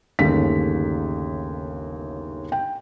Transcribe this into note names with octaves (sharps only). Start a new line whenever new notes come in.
G1 D#2 C#3 A3 B6
G5